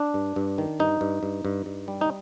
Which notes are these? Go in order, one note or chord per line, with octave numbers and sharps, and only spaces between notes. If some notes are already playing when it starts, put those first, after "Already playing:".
Already playing: D4
G2
G2
D#3
G2 D#4
G2
G2
G2
G2
G3
D#4